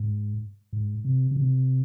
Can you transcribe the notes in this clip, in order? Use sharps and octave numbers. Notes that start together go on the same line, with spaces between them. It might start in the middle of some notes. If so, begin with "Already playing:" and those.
Already playing: G#2
G#2
C3
C#3
C3